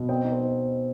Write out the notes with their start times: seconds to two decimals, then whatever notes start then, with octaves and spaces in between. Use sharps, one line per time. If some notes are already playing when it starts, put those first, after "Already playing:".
Already playing: B2
0.09 C4 D#5 G5
0.24 D#4
0.32 C5
0.40 D#4